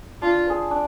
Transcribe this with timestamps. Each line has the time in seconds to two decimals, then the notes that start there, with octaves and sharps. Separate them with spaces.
0.22 D4 F4
0.47 G#4 C5
0.71 D4